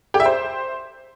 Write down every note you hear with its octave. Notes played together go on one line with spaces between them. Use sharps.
G4
E5
C5